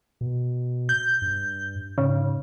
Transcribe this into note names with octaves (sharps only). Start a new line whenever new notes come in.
B2
G6
G2
G#2 C#3